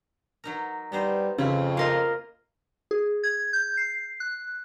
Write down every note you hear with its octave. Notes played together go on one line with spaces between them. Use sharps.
F#3 D#4 A#4
G3 B3 D#4 C5
F2 C#3 C4 E4
A#3 F4 A#4 D#5
G#4
G#6
G6
C7
F#6